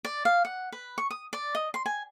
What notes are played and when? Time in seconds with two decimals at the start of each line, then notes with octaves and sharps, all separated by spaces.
0.05 D5
0.25 F5
0.45 F#5
0.72 B4
0.98 C#6
1.11 D#6
1.33 D5
1.55 D#5
1.74 C6
1.86 G#5